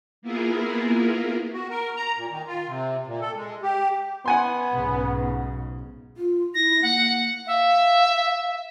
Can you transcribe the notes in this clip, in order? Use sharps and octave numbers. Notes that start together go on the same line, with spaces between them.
A#3 B3 E4 F4 G#4 A#4
F#4
A#4
A#5
A#2
D#3
F4
C3
A#2
A4
G#3
G4
B3 F#5 G#5 C6
B1 G#2 C#3
F4
E4 A#6
A#3 F#5
E5 F5